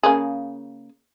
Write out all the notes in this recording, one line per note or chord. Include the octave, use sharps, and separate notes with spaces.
C#3 A#3 G#4